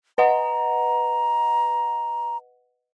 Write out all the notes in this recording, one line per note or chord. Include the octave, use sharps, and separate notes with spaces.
B4 D#5 F#5 A#5